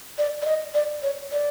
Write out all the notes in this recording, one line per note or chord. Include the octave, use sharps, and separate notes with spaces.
D5
D5
D#5
D5
C#5
D5